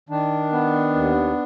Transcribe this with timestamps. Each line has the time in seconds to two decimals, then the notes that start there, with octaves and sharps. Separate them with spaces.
0.09 D#3 D4
0.52 B3
0.94 D#2